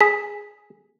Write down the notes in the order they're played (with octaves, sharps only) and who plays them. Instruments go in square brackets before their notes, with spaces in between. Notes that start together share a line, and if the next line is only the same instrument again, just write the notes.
[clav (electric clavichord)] G#4 [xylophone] B6